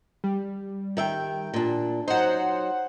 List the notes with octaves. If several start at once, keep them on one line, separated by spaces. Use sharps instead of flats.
G3
D#3 E5 G5
A#2 D4
F#3 D#4 C5 F#5